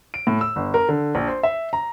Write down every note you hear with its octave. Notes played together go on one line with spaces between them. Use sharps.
D7
A2
E6
G1
A#4
D3
A#1
C5
E5
A#5